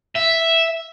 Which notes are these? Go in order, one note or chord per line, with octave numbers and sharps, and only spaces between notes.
E5